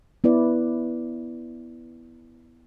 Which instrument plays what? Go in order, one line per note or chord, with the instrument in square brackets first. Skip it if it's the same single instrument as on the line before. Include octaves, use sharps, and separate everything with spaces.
[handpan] B3 E4 B4 D5